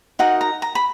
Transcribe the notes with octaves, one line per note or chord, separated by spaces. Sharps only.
D#4 F#4 A#4 D#5 F#5
A#5
A#5
B5